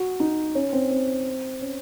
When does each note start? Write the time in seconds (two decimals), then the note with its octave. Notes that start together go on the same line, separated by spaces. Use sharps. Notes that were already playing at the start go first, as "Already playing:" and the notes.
Already playing: F#4
0.20 D#4
0.55 C#4
0.73 C4
0.91 C4
1.62 C#4